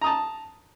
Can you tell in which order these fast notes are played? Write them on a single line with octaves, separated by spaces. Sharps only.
A#5 D#6 A5